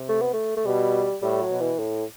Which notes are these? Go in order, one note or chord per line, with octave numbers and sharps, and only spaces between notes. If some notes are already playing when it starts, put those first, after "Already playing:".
Already playing: C3
A3
B3
A3
A3
B2 G3
A2 G3
F#3
B2
E3
A2